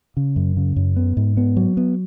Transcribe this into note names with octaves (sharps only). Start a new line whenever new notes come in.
C#3
F#2
C#3
F#2
B3
G#2
B3
F#3
B3